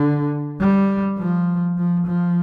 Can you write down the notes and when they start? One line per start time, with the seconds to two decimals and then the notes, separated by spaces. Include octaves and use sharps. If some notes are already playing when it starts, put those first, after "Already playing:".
Already playing: D3
0.60 G3
1.18 F3
1.77 F3
2.06 F3